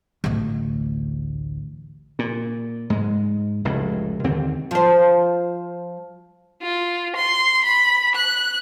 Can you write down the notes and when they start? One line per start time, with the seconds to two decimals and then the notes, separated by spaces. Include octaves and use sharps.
0.24 A1 D2
2.19 A#2
2.90 G#2 G#3
3.65 F1 C#2 A2
4.24 D#2 D3 C4
4.71 F3 C5
6.62 F4
7.16 C6
7.64 B5
8.15 F#6